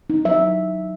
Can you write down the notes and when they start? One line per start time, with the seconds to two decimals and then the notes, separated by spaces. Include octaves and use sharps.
0.10 D#4
0.25 F#3 E5